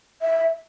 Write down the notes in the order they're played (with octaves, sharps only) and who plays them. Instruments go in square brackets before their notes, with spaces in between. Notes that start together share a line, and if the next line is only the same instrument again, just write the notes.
[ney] E5